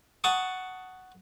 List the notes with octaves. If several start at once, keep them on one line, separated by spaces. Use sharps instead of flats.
F#5 A5 C#6 D#6